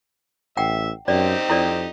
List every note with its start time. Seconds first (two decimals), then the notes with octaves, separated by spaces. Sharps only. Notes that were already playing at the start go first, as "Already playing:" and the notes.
0.57 A1 E5 F#5 G5
1.08 F#2 C4 D#4 G4 D5
1.49 F2 E4 A4 D5